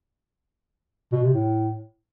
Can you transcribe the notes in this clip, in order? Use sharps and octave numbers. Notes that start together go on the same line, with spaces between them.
B2
C3
A2